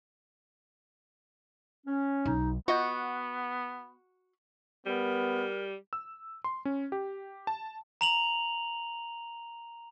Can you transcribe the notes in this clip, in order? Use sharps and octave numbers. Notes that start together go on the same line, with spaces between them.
C#4
B1 D#4
B3 F4 F#4 D#5 G6
G3 B3 A#4
E6
C6
C#4
G4
A5
A#5 F7 F#7